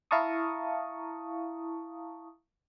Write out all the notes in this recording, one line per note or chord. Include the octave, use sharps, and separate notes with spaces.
E4 F5 A5 A#5 C#6 D#6